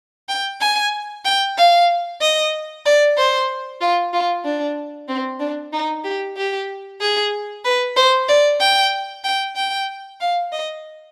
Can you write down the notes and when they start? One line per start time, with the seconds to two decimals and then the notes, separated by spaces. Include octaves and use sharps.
0.29 G5
0.61 G#5
1.25 G5
1.57 F5
2.21 D#5
2.85 D5
3.17 C5
3.81 F4
4.13 F4
4.44 D4
5.08 C4
5.40 D4
5.73 D#4
6.04 G4
6.37 G4
7.01 G#4
7.65 B4
7.96 C5
8.29 D5
8.60 G5
9.24 G5
9.56 G5
10.20 F5
10.52 D#5